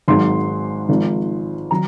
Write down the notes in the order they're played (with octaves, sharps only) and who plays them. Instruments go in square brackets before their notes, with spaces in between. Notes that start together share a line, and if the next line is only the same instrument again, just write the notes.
[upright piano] G#1 G#2 F#3 C6
G#1 G#2 F3
D#3 F#3 A#5